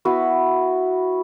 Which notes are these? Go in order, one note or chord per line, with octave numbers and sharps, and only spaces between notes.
B3 E4 F#4 B4